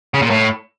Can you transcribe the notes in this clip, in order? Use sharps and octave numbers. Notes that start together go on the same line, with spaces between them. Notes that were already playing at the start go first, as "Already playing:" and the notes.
C#3
A#2
A2